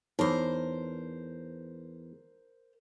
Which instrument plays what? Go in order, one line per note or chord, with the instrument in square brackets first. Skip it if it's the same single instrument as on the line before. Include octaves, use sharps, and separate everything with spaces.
[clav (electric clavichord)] E2 [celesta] D#4 C#5 A5 [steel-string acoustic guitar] A#4 C5